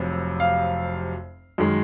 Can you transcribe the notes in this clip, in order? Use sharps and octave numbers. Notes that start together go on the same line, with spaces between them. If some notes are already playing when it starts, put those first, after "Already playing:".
Already playing: F1 F2 C3 F#3
F5
F#2 D#3 G#3